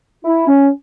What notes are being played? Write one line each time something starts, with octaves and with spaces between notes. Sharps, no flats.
E4
C#4